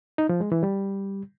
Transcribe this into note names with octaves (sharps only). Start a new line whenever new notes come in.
D#4
F3
G#3
E3
G3